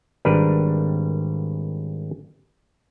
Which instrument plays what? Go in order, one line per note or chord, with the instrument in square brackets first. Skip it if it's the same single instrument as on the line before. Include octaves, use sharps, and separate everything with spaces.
[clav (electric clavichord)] G#1 G3 D4 A#4 B4